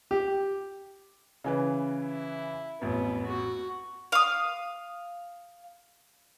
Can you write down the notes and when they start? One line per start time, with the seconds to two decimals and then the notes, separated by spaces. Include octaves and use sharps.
0.11 G4
1.44 C#3 E3 B4
2.05 E4
2.81 A1 F2 B3
3.26 F#4
4.12 F5 D#6